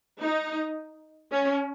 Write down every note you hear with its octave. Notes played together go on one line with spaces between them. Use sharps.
D#4
C#4